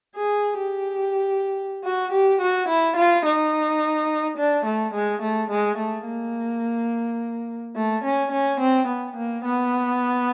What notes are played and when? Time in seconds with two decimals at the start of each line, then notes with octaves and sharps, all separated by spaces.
0.15 G#4
0.58 G4
1.84 F#4
2.12 G4
2.41 F#4
2.68 E4
2.96 F4
3.25 D#4
4.37 D4
4.65 A3
4.94 G#3
5.22 A3
5.51 G#3
5.78 A3
6.06 A#3
7.76 A3
8.04 C#4
8.32 C#4
8.60 C4
8.87 B3
9.17 A#3
9.44 B3